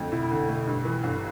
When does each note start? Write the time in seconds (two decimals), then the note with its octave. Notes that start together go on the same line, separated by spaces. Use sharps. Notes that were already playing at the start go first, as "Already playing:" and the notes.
Already playing: F2 D3 A3
0.12 B2 E4
0.31 D3
0.40 B2
0.49 A3
0.67 G2
0.85 E3
1.03 G1